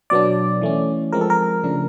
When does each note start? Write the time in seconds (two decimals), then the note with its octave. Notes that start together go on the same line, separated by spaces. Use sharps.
0.10 B2 F#3 B3 D4 D5
0.62 E3 A3 C#4
1.13 F3 G#3 C4 A#4
1.21 A4
1.30 A#4
1.64 C#3 F3 A3 D4